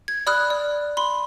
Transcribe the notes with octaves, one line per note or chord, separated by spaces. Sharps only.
G#6
D5 B5 D#6 F6 F#6
D5
B5 C6